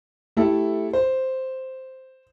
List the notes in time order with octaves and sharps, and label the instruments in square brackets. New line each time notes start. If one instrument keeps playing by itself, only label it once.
[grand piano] A3 E4 G4 A4 E5
C5